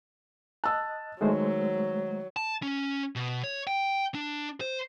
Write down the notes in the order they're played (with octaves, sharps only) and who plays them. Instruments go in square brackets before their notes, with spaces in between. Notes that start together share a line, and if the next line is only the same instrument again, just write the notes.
[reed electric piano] D#5 F#6 [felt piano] A5 E6
[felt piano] D#3 [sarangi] F#3 [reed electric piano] G#3 A3 C5
[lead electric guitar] A5
C#4
B2
C#5
G5
D4
C5